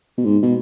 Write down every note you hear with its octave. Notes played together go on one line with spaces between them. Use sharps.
B2
G#2
B2